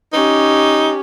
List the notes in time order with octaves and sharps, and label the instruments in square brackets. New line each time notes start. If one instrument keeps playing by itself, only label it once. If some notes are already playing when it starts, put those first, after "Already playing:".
[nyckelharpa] C#4 G4 [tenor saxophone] D#4